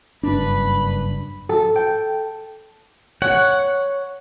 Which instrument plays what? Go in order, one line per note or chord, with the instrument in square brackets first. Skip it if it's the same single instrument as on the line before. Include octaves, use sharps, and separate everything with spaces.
[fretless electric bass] F#1 G2 D4 [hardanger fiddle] B4 B5
[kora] A4
G5
[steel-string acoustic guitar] C#5 [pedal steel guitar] F#5